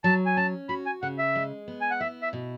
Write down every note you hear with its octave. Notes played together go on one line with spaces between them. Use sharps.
F#3 A5
G#5
C#4 A5
F#4 B5
G#5
C#3 F#5
E5
G#3
B3
G#5
F#5
E4 E5
E5
B2